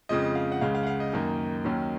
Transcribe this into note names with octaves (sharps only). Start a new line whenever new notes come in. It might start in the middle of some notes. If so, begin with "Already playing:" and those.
F2 C#3 F3 G#3 D#5
F5
F#5
C#2 C#3 G#3 F5
F5
F#5
F5
D#5
F#2 D#3 A#3 D#4
D#2 D#3 F#3 C#4